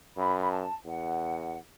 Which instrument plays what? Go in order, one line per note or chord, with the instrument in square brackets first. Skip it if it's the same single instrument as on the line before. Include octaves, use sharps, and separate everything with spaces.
[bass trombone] F#2 [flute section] B5
[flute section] B5
A5
[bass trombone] E2 [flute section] F#5